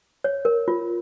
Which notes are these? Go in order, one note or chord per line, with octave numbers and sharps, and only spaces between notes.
C#5
A#4
F4